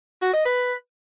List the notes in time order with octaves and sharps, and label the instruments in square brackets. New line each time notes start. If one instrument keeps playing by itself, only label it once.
[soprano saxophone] F#4
D#5
B4